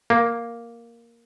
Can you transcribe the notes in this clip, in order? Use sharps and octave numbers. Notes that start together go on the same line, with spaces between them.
A#3